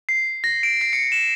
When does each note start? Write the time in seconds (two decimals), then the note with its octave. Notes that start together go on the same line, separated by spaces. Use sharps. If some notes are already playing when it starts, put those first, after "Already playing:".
0.09 C7
0.44 A#6
0.63 D7
0.81 C7
0.93 C#7
1.12 E7